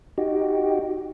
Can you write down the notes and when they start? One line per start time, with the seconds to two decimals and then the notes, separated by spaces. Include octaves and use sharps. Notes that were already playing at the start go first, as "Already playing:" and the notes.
0.18 D#4 F#4 G4